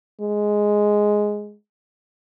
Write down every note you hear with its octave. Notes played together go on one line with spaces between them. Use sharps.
G#3